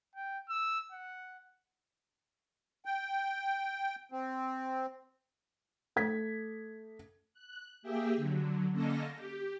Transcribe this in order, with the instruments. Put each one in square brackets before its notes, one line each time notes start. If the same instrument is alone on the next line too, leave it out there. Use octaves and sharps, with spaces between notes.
[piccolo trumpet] G5
E6
F#5
[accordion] G5
C4
[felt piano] A3 G#6 B6
[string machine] F#6
A#3 G4 G#4 E5 G5
D3 F#3
D3 A#3 C#4 A4 D#5 A#6
G4